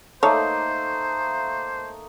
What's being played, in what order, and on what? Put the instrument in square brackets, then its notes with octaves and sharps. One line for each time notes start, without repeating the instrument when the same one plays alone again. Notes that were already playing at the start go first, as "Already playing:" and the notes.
[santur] A3 A#3 D#4 [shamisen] A4 C#5 [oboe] C5